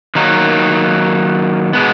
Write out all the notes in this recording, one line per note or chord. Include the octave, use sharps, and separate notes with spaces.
D#3 F#3 A#3 D#4
B2 G#3 B3